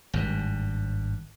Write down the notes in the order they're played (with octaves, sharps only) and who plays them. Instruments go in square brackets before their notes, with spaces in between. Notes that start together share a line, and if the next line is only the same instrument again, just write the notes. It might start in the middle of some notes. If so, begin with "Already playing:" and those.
[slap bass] G#1 G2